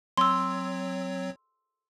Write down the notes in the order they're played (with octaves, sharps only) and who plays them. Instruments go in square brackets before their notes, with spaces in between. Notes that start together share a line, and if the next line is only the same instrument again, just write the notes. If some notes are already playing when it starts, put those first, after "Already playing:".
[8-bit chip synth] F#3 C4 C#5 [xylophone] C6 E6